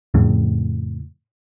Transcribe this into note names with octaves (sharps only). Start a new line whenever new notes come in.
F2 A2 C#3